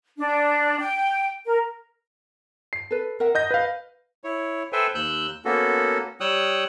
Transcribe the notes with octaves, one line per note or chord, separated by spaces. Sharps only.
D4
G5
A#4
C7
A4 B4
A#4 E5 F#5
D#5 G6 A#6
B4 F5
E4 C#5
A4 B4 C5 E5 G5 G#5
D#2 E6 F#6 G6
A#3 B3 C#4 F#4 A4
G3 C#5 G5 D#6 E6 F#6